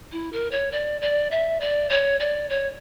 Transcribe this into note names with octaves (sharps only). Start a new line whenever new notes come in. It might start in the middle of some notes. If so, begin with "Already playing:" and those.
E4
A#4
C#5
D5
D5
E5
D5
C#5
D5
C#5